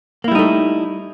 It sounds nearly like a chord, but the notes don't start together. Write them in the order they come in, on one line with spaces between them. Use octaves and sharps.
A#3 E4 G3 D#4 A3